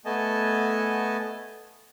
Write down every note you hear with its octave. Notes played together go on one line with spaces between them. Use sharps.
A3 B3 D#5 G#5 A5